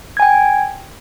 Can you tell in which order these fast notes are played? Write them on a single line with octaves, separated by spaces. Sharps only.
G#6 G#5 G5